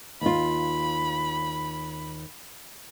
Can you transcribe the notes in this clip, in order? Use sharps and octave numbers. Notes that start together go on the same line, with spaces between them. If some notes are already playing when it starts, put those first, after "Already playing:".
D#2 F4 B5